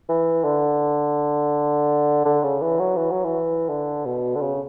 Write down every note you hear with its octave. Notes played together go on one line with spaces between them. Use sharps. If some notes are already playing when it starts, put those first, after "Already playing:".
E3
D3
D3
C#3
E3
F#3
E3
F#3
E3
D3
B2
D3
C#3